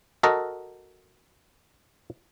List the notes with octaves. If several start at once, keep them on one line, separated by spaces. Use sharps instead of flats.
F#4 A4 A#4 D#5